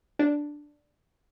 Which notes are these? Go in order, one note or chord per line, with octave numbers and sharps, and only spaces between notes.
D4